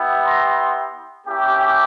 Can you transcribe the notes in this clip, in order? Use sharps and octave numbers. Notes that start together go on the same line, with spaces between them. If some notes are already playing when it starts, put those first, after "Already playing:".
Already playing: B3 E4 G4
A#5 C6
A#3 C#4 E4 G4